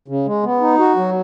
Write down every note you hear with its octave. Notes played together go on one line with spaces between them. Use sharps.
C#3
G#3
B3
D#4
F#4
F#3